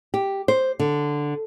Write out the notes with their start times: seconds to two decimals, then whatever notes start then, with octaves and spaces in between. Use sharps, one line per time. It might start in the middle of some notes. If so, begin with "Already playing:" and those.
0.14 G4
0.48 C5
0.79 D3